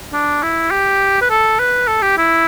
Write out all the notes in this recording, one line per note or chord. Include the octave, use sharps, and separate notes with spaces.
D4
E4
G4
B4
A4
B4
A4
G4
E4